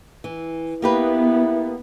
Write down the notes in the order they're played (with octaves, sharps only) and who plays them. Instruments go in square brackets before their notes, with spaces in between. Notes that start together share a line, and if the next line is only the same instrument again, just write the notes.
[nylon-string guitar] E3
[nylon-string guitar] A#3 G4 B4 [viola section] B3 [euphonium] E4